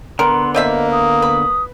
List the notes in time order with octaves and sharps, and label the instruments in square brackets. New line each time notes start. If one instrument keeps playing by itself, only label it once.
[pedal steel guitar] D3 B3 [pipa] A#4 [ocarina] C6
[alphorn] A#3 [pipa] C4 F4 E5 [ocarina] D#5
[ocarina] D#6
[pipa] B4